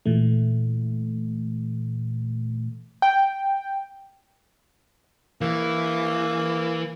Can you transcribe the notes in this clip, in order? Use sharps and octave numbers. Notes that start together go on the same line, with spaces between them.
A#2 E3 A3
G5
E3 A#3